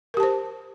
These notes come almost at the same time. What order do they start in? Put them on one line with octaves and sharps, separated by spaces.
A#4 G4 A5 C5